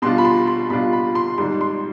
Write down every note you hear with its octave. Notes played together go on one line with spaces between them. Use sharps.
B2 G3 D4 F4 C6
B5
C6
C6
B2 G3 D4 F4 B5
B5
C6
G#1 G#2 G3 C6
C6